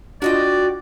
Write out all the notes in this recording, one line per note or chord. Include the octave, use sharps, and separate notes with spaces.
D4 F4 F#4 D5 D#5 G5